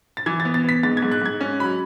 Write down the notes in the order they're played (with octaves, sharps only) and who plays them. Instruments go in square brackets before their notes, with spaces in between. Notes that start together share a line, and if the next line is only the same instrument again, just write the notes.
[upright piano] A6
E3 G#6
A6
B3
A6
B3 B6
G#2 A6
G#6
G#2
F#6
G#2 G#6
C#4
F#3 B5